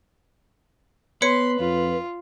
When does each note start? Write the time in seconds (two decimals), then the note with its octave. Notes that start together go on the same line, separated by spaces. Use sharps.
1.22 B3 B4 C#5 C6 C#7
1.60 F2 F4